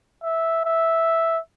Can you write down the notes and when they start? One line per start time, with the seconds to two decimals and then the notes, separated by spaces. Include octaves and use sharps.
0.23 E5
0.65 E5